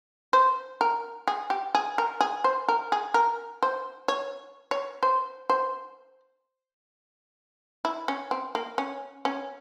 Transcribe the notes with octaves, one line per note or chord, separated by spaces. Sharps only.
C5
A#4
G#4
G4
G#4
A#4
G#4
C5
A#4
G#4
A#4
C5
C#5
C#5
C5
C5
E4
C#4
C4
A#3
C#4
C#4